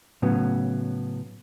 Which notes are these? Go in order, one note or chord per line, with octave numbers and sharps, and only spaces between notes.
A2 C#3 F#3 B3